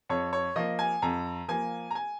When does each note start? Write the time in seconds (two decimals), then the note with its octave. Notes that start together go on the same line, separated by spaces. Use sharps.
0.09 F2 C#5
0.33 C#5
0.56 F3 A#3 D#5
0.79 G#5
1.02 F2 A#5
1.48 F3 A#3 G#5
1.91 A#5
1.95 G#5